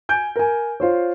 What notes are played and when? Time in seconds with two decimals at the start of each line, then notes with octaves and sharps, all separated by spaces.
0.09 G#5 G6 D7
0.36 A#4 G#5
0.80 F4 C5 C#5